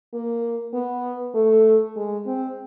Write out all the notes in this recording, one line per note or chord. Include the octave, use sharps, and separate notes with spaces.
A#3
B3
A3
G#3
C4